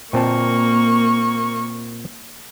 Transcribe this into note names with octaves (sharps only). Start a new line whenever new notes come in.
A#2 A#3 C4 A5 C#6